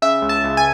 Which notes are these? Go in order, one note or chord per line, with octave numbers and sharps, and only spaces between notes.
C#3 E5
C#2
A5
C#2
G#5